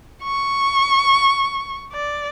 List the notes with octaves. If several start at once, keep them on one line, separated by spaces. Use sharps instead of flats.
C#6
D5